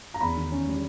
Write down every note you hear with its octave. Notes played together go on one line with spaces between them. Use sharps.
A#5
E2 B5
D#3
C#4
G3